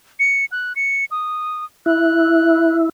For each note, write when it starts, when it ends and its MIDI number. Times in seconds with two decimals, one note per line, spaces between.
0.20 0.45 97
0.52 0.73 90
0.76 1.05 97
1.11 1.65 87
1.86 2.89 64
1.86 2.77 90